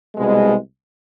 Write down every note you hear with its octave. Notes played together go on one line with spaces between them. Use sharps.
C2 B2 G#3